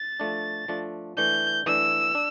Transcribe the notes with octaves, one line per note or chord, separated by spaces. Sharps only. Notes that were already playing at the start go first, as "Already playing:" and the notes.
Already playing: A6
F3 A3 D4
F3 A3 D4
E3 A3 D4 G6
E3 A3 D4 E6
D4